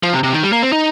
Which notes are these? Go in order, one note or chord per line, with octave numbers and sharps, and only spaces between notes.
F3
C3
C3
D#3
G3
A#3
C4
D#4